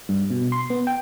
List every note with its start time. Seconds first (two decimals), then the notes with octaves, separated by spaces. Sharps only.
0.09 G2
0.30 B2
0.52 C6
0.70 B3
0.87 G5